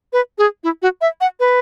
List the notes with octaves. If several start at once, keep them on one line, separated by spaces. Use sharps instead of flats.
B4
G#4
E4
F#4
E5
F#5
B4